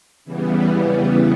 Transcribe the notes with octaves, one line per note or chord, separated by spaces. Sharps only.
E2 C#3 E3 G3 B3